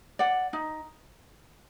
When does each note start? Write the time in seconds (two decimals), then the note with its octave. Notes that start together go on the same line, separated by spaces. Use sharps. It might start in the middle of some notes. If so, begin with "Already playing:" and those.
0.19 D5 F#5
0.53 D#4